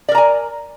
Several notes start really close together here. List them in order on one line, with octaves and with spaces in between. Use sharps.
D5 A#4 A#5 G#5